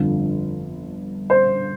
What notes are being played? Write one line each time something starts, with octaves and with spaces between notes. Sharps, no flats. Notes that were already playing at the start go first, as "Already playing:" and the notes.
Already playing: G1 F2 D3 F3
C5